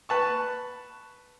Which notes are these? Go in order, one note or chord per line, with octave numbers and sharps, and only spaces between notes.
B4 A5 C#6